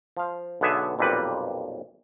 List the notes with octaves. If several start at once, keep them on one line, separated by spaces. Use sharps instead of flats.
F3 F5
B1 D3 B3 G#4 E5
B1 F2 A#2 G3 B4